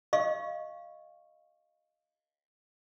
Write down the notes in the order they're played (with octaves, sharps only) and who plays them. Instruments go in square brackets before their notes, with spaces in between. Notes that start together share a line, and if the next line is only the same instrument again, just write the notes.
[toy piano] D#5 F5 C#6